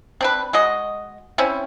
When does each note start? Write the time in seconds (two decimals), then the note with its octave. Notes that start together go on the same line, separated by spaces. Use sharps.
0.21 C4 D4 B4
0.53 G#3 F#4 D#5
1.38 C4 C#4 E4